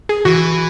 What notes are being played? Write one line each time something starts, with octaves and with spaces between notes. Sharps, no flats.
G#4
E3 F#4